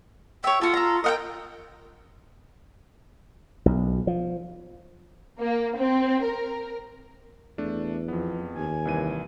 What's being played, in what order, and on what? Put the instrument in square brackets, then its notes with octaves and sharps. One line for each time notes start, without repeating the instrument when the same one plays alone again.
[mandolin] C#5 E5 [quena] G5
[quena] F4 [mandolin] F#4 A4
[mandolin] A4 A#5
[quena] A#4 [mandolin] D#5 F#5 G5
[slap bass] B1
F3
[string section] A#3
C4
A#4
[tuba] E2 [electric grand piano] A3 D4
[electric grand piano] F2 B3 [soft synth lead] F3
[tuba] D#2 [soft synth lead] G#5
[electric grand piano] C2 E3 D#7